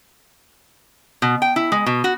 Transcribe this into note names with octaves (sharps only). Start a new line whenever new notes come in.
B2
G5
E4
G#3
B2
F#4